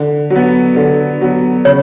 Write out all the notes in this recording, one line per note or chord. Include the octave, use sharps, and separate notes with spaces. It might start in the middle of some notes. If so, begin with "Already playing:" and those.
Already playing: D3
F#3
B3
D3
F#3 B3
C#3 C#5